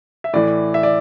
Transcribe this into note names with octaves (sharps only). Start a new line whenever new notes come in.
E5
A2 E3 D5
E5
D5